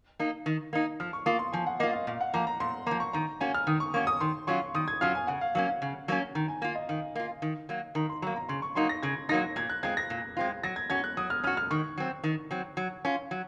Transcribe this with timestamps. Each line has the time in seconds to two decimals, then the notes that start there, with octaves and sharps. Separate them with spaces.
0.19 A#3 D#4
0.46 D#3
0.73 A#3 D#4
1.00 F3 F6
1.13 C#6
1.26 A#3 F4 D#6
1.39 C6
1.52 F3 G#5
1.67 F#5
1.80 A#3 F4 D#5
1.93 F5
2.07 A#2 F5
2.21 F#5
2.34 F3 A#3 A#5
2.47 A#5
2.60 A#2 C6
2.86 F3 A#3 A#5
3.00 C#6
3.13 D#3 A#5
3.40 A#3 C#4 F#4 G#5
3.54 F6
3.67 D#3 D#6
3.80 C#6
3.94 A#3 C#4 F#4 C#6
4.07 D#6
4.21 D#3 C6
4.47 F#3 C#4 F4 C#6
4.74 D#3 D#6
4.88 G#6
5.01 F#3 C#4 F4 F6
5.15 G#5
5.27 C#3 F#5
5.41 F5
5.55 F#3 A#3 C#4 F5
5.69 F5
5.82 C#3
6.08 F#3 A#3 C#4
6.35 D#3 A#5
6.48 G#5
6.61 A#3 F4 F5
6.75 D#5
6.89 D#3 F5
7.15 A#3 F4
7.42 D#3
7.69 F#3 A#3
7.95 D#3 A#5
8.09 C6
8.22 F#3 A#3 A#5
8.36 A#5
8.49 C#3 C6
8.62 C#6
8.75 F#3 A#3 D#4 C6
8.89 A#6
9.03 C#3 G#6
9.29 F#3 A#3 D#4 A#6
9.56 A#2 G#6
9.70 F#6
9.83 G#3 C4 F4 G#6
9.97 A#6
10.10 A#2
10.37 G#3 C4 F4
10.63 F#3 A#6
10.76 G#6
10.90 C#4 F#4 G#6
11.04 F#6
11.17 F#3 D#6
11.30 F6
11.44 C#4 F#4 F6
11.57 F6
11.71 D#3 C#6
11.98 F#3 C4
12.24 D#3
12.51 F#3 C4
12.77 F#3
13.05 C#4 F4
13.31 F#3